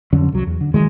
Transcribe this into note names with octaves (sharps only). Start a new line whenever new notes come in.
F2 D3 F#3 C#4
C2 F#3
E2
D3
D#3 E3 F#3 G#3